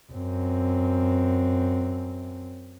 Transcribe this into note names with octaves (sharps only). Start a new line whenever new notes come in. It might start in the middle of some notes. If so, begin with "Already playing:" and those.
F#2 C4